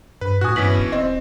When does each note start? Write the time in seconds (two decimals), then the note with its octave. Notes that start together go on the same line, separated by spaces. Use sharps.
0.21 G2 B4
0.41 A2 F#4 G#5 D#6 F#6
0.56 G2 B2 E3 C#4 B6 F#7
0.79 D#1
0.92 C4 D#5